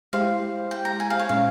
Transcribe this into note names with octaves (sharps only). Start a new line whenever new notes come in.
G#3 E4 G4 C5 F5
G5
A#5
G#5
F5
C#5
A#2 G#3 C#4 F5